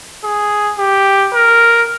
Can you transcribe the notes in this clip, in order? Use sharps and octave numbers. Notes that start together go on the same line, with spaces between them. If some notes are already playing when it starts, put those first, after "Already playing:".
G#4
G4
A#4